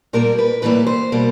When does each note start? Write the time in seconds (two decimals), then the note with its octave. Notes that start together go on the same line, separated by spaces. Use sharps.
0.13 A#2 G3 A#3 A#4
0.38 B4
0.62 A2 E3 G3 A#3 B4
0.87 C5
1.12 B2 G3 A#3